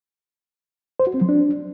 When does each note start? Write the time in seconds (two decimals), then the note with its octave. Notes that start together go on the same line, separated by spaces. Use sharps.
1.00 C5
1.07 F#4
1.14 C4
1.21 F#3
1.29 D4